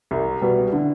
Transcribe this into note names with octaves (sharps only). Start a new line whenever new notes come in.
C2
B2 G3 B3
D3